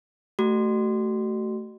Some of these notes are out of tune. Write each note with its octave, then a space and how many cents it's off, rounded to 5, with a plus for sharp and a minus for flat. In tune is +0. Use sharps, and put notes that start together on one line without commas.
A3 +0 F#4 +35